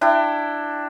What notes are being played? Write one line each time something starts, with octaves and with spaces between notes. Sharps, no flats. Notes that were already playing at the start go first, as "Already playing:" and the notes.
D4 E4 G5